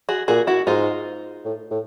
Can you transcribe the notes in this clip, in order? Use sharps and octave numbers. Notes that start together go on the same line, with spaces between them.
F#4 G#4
A#2 F#4 G#4
E4 F#4
G#2 D#4 F4
A2
A2